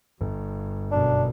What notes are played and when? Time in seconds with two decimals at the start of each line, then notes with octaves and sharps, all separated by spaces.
0.21 G1 G2
0.91 F#2 B2 D4